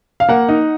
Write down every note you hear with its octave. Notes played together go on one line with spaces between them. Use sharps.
F5
A#3 F#5
D#4